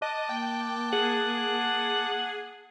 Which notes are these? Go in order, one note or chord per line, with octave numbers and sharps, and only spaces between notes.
D#5 A5 D6 F#6
A#3 G5
G#4 F#5